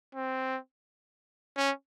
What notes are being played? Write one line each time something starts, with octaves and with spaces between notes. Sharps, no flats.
C4
C#4